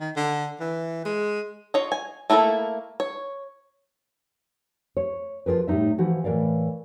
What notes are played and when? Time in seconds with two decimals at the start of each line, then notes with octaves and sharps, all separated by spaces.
0.01 D#3
0.16 D3
0.60 E3
1.05 G#3
1.74 F4 C#5 D#5
1.92 G#5
2.30 A3 A#3 E4 F#4 A4
3.00 C#5
4.97 C#5
5.46 F3 F4 G#4 A#4 B4
5.68 A2 G3 A#3 D#4 E5
5.98 E3 F3 F#4
6.24 A2 E3 A#4 D5 F5